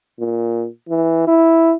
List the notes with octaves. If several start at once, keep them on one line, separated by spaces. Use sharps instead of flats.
A#2
E3
E4